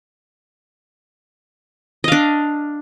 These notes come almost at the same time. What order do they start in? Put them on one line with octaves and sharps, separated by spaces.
D#5 F5 D4